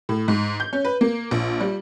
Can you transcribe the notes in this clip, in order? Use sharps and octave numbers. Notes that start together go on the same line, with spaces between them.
A2
G#2
G6
C#4
B4
A#3
A#1
G3